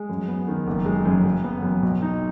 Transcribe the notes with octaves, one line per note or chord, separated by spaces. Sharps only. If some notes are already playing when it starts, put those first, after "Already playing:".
Already playing: G#3
F#2
B3
D#3
F#1
G#3
F#2
F#1
B3
F#2
B1
D#4